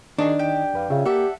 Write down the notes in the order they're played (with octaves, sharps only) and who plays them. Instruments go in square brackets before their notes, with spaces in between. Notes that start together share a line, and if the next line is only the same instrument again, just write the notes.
[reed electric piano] D#3 D#4 D#5 [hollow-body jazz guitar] D4 [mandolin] F#4 G#4
[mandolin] G4 G5
[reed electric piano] F2 B4 F5
[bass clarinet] C#3 [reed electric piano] C#4 F4 E5
[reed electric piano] A#3 [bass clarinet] G4 [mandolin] A4 E5 F#5